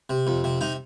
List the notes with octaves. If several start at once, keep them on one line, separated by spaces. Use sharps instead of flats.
C3
F2
C3
C3 D#4